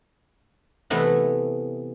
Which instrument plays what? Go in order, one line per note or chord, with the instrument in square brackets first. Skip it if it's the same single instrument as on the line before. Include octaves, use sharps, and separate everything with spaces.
[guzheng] C3 E3 A3 B3 E4 D#5